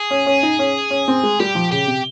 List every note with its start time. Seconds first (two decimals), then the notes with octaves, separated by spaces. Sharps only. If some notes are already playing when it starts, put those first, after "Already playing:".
Already playing: G#4
0.11 C#4
0.26 C#4
0.43 D#4
0.59 C#4
0.91 C#4
1.08 C4
1.23 G#3
1.40 G3 G4
1.55 F3
1.71 C#3 G4
1.87 C3